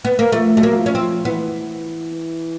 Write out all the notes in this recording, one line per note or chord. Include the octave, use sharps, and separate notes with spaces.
B3
A#3
F3 A3
F#3 A3
A#3
F#3
F3
C#4
C4
F3
E3 B3